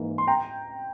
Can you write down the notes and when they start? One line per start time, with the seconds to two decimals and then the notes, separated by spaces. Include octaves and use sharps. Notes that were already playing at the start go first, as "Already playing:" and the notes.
Already playing: G#2 E3 A#3
0.18 C6
0.27 G5 A#5